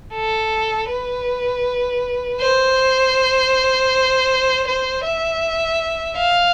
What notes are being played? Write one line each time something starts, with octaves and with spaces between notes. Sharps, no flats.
A4
B4
C5
C5
E5
F5